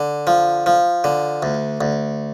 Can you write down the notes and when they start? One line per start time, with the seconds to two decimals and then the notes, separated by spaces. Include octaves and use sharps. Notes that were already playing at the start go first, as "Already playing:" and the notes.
Already playing: D3
0.27 F3
0.66 F3
1.04 D3
1.43 D2
1.81 D2